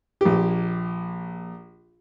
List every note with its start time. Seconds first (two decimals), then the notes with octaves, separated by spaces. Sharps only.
0.21 A#1 G4